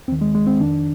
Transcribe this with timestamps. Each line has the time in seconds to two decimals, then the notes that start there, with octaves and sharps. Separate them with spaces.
0.08 D#2 C4
0.12 D#3
0.21 G#3
0.35 G#3
0.47 C4
0.60 F2 D#3 D4